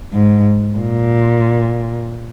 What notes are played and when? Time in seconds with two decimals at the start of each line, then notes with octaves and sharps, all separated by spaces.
0.13 G#2
0.78 A#2